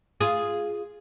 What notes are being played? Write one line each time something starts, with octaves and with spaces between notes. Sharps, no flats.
F4 G#4